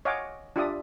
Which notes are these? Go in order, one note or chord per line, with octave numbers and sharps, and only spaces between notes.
C#5 D#5 F5 F#5 G#5 D6
D4 F4 G4 D5 E5 D#6